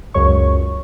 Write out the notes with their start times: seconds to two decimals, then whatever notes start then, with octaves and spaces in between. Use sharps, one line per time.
0.14 C#2 F#2 C#5 C#6